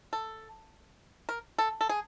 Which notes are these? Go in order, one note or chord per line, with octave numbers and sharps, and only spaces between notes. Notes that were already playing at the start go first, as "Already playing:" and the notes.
A4
A#4
A4
A4
G#4